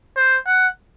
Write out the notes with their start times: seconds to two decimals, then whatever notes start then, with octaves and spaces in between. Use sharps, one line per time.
0.17 C5
0.47 F#5